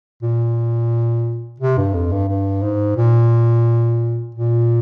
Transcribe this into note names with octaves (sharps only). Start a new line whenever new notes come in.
A#2
C3
G2
F2
G2
G2
G#2
A#2
A#2